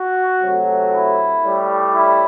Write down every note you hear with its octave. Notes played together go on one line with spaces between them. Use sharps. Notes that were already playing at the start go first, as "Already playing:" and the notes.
Already playing: F#4
C3 F#3 A3
E4
A2 G3
E4